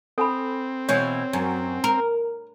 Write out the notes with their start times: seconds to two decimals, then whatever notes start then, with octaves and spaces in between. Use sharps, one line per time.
0.18 C4 A4 G#5 B5
0.89 B2 E3 C#5
1.33 F#2
1.84 A#4